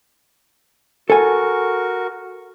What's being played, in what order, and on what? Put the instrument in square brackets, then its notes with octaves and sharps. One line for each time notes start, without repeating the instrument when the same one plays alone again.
[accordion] F#4 A#4 C#6 [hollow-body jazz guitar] A4 G#5